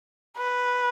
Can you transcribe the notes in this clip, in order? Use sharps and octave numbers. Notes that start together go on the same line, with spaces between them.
B4